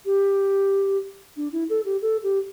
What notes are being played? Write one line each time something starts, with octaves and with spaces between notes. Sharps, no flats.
G4
D4
E4
A4
G4
A4
G4